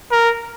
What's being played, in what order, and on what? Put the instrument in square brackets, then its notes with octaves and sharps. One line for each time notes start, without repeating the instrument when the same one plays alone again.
[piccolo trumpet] A#4